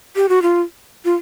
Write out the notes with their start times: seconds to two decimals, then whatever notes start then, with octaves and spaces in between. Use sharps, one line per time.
0.16 G4
0.29 F#4
0.42 F4
1.05 F4